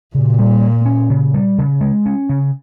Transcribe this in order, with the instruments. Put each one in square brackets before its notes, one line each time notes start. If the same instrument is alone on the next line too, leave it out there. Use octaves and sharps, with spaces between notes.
[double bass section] A#2 [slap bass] C#3
[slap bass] G3
A#3
C#4
C#3
G3
C#3
G#3
C#4
C#3